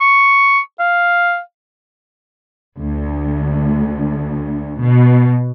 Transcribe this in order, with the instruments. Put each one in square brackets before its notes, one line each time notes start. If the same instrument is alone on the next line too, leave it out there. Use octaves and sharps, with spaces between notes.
[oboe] C#6
F5
[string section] D2
B2